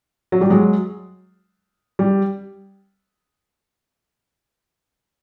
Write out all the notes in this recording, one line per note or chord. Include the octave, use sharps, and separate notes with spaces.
F#3
G3
F#3 G#3
G3